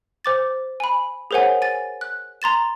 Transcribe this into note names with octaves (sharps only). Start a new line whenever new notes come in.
C5 D6 A6
G#5 B5
G#4 A#4 C5 C#5 F#5 G#5
G#5 A6
F#6
A#5 C6 A6 E7